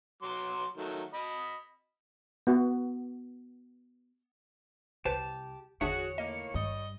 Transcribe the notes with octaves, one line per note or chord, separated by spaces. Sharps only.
F#3 C6 D6
D#3 F#3 A3
D#5 B5 D#6
B3 F#4
C2 G4 B4 C5 A5
G1 E2 D3 D4 F#4 G#4 C#5 E5
A2 D#3 A#3 D#5
G#1 G2 G3 D#5